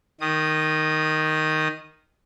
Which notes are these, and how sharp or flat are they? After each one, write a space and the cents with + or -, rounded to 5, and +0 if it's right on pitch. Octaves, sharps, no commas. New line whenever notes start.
D#3 +0 D#6 -20